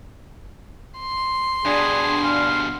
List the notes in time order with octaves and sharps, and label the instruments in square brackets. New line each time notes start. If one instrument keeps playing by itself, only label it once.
[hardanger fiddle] C6
[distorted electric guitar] G2 B2 [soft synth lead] D4 [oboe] G#4
[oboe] F5